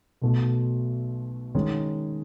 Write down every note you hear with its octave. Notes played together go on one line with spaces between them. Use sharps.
B1 B2 A3
D#3 G#3 C#4